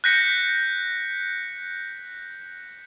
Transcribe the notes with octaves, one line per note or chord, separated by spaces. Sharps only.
F#6 G6 A#6 B6 C#7